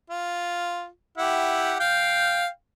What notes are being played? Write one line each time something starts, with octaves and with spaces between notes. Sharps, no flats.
F4
E4 G4 F#5
F5 G5